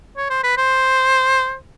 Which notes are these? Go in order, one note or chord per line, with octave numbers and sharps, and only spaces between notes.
C#5
C5
B4
C5